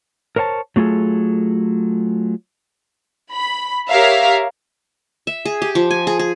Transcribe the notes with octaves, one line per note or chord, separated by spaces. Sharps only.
A#4 C5 C#5 G#5 A5
F#3 A3 F4 G#4 A4
B5
G4 A#4 C#5 E5 F5
E5
G#4
G4
F3
G#5
G#4
G#4